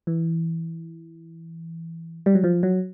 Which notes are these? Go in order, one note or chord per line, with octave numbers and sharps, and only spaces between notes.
E3
G3
F#3
F3
F#3